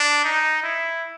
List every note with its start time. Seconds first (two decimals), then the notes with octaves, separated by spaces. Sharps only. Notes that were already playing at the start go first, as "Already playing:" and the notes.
Already playing: D4
0.24 D#4
0.63 E4